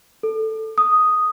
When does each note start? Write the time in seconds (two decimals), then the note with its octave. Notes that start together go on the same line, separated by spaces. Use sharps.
0.23 A4
0.78 D#6